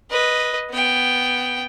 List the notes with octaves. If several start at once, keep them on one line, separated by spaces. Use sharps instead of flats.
B4 D#5
B3 G5